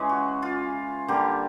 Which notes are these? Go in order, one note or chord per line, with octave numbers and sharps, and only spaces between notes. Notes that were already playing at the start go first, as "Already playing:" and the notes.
Already playing: C#3 E3 G#3
F#4
F4
D3 G3 A#3 G4